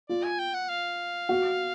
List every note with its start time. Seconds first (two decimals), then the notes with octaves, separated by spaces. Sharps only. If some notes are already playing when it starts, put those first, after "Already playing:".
0.09 F4 D5
0.24 G#5
0.39 G5
0.54 F#5
0.69 F5
1.29 F#4